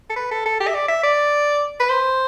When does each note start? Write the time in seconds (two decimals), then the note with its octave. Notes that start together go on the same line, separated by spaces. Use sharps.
0.10 A4
0.16 B4
0.31 A4
0.46 A4
0.60 G4
0.68 E5
0.75 D5
0.88 E5
1.04 D5
1.80 B4
1.90 C5